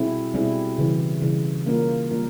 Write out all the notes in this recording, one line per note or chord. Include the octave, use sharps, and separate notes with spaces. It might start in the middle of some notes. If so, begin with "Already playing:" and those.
Already playing: B2 G3 C4 E4 G#4
B2 G3 C4 E4 G#4
C#3 E3 G3
C#3 E3 G3
G3 A#3 C#4 F4 A#4
G3 A#3 C#4 F4 A#4